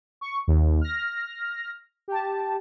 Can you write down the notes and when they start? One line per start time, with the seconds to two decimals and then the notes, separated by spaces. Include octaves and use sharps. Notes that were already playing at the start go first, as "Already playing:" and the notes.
0.21 C#6
0.48 D#2
0.81 F6 A#6
2.08 G4 A5